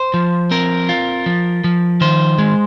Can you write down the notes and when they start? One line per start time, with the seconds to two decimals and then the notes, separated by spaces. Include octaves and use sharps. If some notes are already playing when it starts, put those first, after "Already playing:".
Already playing: C5
0.14 F3
0.51 C4 A#4
0.89 F4
1.26 F3
1.64 F3
2.01 D#3 C5
2.39 G#3